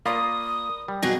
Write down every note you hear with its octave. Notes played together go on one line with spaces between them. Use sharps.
A#3 F4 A#4 D5 B5 D#6
G3
B2 F#3 G#4 A#6